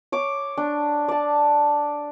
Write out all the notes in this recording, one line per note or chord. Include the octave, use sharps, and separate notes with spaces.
C#5 D6
D4
D5 A5